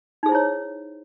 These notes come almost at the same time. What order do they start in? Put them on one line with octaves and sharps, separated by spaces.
D#4 G#4 C5 E4 C#5